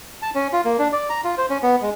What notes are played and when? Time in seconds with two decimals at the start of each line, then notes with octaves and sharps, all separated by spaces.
0.22 A5
0.35 C#4
0.53 F4
0.65 A#3
0.79 D4
0.92 D5
1.10 A#5
1.24 F4
1.38 C5
1.50 C#4
1.63 B3
1.82 G#3